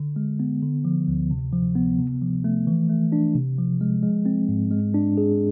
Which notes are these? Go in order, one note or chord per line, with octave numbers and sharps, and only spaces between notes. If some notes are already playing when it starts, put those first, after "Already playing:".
Already playing: D3
G#3
B3
D3
F3
D2
C3
F3
B3
C3
F3
A3
E3
A3
D4
C3
F3
G#3
G#3
C4
G#2
G#3
D4
G#4